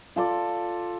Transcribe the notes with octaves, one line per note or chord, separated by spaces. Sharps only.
F4 A4 D5